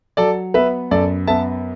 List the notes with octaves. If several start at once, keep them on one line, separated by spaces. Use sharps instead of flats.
F#3 A4 D5
B3 B4 E5
F#2 A4 D5
B3 E5 A5